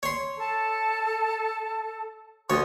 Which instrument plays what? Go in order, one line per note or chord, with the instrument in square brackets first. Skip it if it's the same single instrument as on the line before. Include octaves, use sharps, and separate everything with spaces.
[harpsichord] C#5 C6
[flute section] A4 A5
[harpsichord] D2 C#5 [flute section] C6 D#6